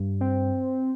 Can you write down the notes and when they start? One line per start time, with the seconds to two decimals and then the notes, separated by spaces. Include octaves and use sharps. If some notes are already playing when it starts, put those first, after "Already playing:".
Already playing: G2
0.21 C4